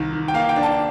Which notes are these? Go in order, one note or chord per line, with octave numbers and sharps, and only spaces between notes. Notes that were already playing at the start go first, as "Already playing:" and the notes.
Already playing: C2 D#3
D#3
G5
A#3 F5
G5
D4
A5